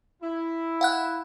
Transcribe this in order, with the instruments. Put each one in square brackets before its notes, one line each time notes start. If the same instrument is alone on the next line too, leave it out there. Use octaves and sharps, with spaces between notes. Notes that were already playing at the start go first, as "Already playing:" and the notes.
[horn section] E4
[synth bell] F5 F#5 F#6